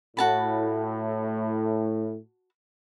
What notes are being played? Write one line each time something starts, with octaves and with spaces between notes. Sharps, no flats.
A2 F#4 A5 B5